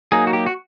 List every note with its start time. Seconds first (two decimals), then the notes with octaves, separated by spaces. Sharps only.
0.12 F#3 A#3 D#4 G#4
0.27 F#4
0.33 G4
0.46 F#4